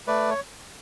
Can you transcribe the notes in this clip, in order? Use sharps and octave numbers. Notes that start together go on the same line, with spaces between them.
A3 B4 D5
C#5